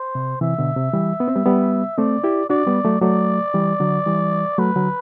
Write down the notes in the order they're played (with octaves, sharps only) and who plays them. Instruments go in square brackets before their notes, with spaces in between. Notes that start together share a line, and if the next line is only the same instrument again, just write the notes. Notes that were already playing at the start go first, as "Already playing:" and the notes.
Already playing: [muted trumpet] C5
[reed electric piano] C3
[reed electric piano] C3 E3 [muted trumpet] E5
[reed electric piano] B2 D3
C3
E3 G3
B3
C4
G3 B3
G3 B3
[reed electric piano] A3 C4 [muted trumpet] D5
[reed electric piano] E4 G4
[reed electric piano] D4 F#4 [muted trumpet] D5
[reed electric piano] G3 B3
F#3 A3
[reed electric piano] F#3 A3 [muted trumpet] D5
[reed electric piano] E3 G3
D3 F#3
E3 G3
[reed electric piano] F#3 A3 [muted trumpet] B4
[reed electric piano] D3 F#3